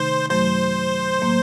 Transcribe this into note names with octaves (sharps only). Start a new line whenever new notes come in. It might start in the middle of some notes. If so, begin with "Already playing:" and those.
Already playing: C3 D#3 A3 D#4 C5
F#2 F#3 A3 C5
A2 F#3 A#3